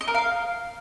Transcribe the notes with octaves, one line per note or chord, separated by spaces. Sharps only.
D#5
A#4
F5